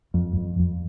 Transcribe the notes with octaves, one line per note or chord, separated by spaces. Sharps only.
F2
F2
F2